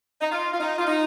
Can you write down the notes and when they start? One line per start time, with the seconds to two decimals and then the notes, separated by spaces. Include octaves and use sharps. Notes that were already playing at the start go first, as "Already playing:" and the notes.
0.21 D#4
0.32 F4
0.54 F4
0.60 D#4
0.78 F4
0.87 D#4